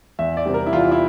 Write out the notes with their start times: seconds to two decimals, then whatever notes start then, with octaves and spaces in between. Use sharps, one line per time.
0.19 E2 E5
0.37 D5
0.46 C3 G3
0.54 A#4
0.66 E4
0.73 E2 F4
0.91 E4